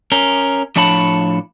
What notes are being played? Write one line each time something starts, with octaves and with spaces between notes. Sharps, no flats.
C#4 A#4
A2 F3 D4 C#5 A5 B5